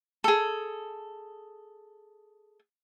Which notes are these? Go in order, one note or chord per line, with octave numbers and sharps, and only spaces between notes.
G#4 A4